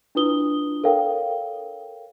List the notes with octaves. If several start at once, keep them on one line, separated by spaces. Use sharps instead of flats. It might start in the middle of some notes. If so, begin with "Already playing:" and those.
D4 E4 F4 B4 D#6 G7
A4 A#4 C#5 F5 G5